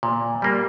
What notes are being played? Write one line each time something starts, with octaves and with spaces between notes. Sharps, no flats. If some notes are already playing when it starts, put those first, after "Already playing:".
A#2
G3 A#3